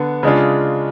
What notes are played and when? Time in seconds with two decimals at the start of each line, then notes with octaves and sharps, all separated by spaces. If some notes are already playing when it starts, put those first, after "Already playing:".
Already playing: D3 B3
0.23 C#3 G#3 D4 F4